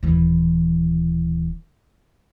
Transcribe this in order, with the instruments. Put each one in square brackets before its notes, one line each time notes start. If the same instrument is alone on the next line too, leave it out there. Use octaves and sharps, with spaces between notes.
[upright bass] D#1 E3